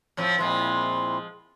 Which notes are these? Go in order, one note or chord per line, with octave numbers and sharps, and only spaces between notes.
A2 F3 C4
A#2 F3 G#3 C4 E4 C6